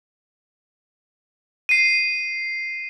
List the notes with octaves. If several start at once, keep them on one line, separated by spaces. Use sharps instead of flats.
C7 D#7